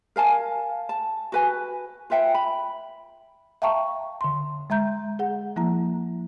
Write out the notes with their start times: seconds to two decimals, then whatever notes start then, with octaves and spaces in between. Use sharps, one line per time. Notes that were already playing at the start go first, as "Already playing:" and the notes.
0.16 A#4 F5 G#5 A5
0.89 A5
1.32 F#4 B4 G#5
2.10 F4 B4 E5 G5
2.34 B5
3.62 E5 F5 G5 A5 A#5 C#6
4.21 D3 C6
4.70 G#3 E5 A#5 G6
5.19 G#4 F#5
5.56 F3 A#3 E4 A#5